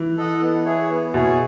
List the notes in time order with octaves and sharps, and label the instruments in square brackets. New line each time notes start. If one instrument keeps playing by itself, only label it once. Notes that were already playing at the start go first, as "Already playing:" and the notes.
Already playing: [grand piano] E3
[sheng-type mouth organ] A4 D#5 F#5
B3
E4 G#4 C#5
B3
[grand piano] B2 [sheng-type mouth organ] E4 G#4 C#5